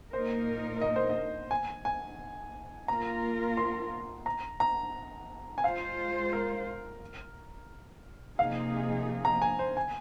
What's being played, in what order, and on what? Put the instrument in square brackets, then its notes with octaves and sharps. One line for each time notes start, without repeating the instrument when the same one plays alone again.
[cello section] A#2 A#3 D#4 A#4 [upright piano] C5
[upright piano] D#5
C5
D#5
G#5
G#5
[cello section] A#3 F4 A#4 [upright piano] A#5
[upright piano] C6
A#5
A#5
G#5
[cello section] G#3 F4 C5 [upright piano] F5
[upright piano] A#4
[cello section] C3 F3 A#3 D#4 G#4 [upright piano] F5
[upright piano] A#5
G#5
C5
G#5